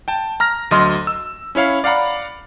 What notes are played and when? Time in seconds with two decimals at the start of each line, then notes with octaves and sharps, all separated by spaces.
0.08 G5 A5
0.40 A#5 F6 A#6
0.71 D2 F#3 D#5 C6 F6
1.07 E6
1.55 C#4 E4 C#5 F5 B5
1.84 D5 F5 F#5 A#5 B5